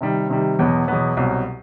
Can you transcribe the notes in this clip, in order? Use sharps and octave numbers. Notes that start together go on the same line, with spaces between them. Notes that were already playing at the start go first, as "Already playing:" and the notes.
C3 D#3 G3
C3 D#3 G3
E2 B2 F#3 B3
E2 B2 F#3 B3
C2 B2 F#3